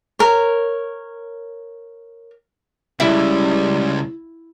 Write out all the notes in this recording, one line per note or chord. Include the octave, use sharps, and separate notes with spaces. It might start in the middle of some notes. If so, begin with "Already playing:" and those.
A#4 C#5
C#2 C#3 G3 E4